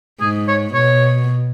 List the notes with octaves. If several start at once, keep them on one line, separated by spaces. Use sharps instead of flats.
G#2 G#4
C#5
B2 C#5